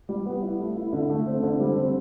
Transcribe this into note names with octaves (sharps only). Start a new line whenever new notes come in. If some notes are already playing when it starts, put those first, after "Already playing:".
G3
B3
E4
A3
E4
D3
A3
C4
D3
G3
C4